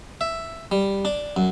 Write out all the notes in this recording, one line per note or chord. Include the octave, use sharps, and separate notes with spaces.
E5
G3
D4
F#2